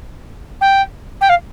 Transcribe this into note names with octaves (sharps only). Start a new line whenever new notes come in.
G5
G5
F5